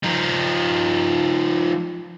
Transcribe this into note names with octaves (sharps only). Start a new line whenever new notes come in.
F3 D#4